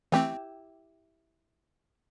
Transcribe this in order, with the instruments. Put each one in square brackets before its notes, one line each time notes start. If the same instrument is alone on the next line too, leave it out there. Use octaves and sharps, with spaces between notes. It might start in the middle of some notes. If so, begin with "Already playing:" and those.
[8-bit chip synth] E3 A3 C4 [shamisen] E4 G4